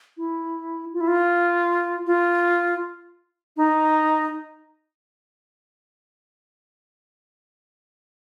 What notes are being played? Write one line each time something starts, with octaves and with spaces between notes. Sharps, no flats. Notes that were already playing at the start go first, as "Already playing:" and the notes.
E4
F4
E4
F4
F4
D#4